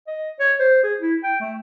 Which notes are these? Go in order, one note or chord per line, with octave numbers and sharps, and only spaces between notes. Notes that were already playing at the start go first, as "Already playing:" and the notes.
D#5
C#5
C5
G#4
E4
G5
A3